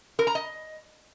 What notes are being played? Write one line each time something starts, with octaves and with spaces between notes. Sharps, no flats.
A#4
A#5
D#5